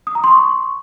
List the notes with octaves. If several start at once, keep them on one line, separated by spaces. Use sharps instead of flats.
D#6
A#5
C6
C#6